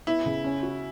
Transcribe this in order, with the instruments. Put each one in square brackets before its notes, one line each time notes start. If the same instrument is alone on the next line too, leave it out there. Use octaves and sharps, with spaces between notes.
[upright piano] B3 [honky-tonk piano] E4
[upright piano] C#3
C#4
F#4